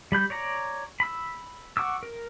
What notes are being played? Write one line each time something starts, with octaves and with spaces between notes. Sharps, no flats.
G3 B5 G6
C#5 D5 A#5
B5 E6
F#5 C#6 D6 E6
A#4